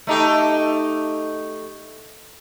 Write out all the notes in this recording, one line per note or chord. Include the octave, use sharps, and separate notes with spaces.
A3 D#4 G4